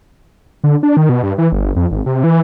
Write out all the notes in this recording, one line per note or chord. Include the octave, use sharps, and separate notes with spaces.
D3
D4
D#3
B2
G2
E3
G1
F2
G#1
C3
E3